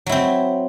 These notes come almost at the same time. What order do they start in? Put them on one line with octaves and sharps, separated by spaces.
F#3 E4 C4